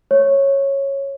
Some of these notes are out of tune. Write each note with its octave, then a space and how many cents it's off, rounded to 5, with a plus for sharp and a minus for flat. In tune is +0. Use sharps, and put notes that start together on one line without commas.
C#5 -10